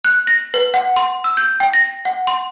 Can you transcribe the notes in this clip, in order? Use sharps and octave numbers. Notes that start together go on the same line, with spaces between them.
F#6
A#6
B4
F#5
C6
E6
G6
G5
A#6
F#5
C6